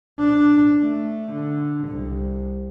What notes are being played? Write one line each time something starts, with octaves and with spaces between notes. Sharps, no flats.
D4
A3
D3
C2